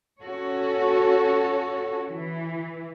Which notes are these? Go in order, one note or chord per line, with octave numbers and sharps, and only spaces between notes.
C#4 F#4 A4 C#5
E3